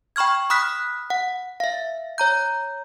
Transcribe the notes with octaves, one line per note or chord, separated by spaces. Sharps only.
G5 B5 C#6 F6 G#6
B5 D#6 F6 F#6 B6
F#5
E5 F5
C#5 A#5 G6